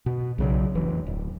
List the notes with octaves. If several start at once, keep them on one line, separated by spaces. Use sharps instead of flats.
B2
B1 C#3 F#3
F1 E3
D1